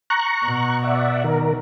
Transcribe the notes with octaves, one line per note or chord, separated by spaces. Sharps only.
A#5 C#6 F#6
B2
D5 E5 F#5
D#3 A#4